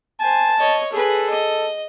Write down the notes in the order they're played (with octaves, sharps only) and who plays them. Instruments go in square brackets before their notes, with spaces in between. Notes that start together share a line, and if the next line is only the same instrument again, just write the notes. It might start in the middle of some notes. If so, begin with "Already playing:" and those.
[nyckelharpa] C5 G#5 [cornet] A5
[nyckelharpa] C#5 D#5
[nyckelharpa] G#4 B4 [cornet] A4
[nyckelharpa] D#5